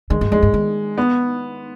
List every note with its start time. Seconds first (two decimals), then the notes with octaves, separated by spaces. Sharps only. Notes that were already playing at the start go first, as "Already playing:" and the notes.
0.10 D#3 G#3
0.21 G2
0.32 F2 G#3
0.42 G2
0.54 D#3
0.98 B3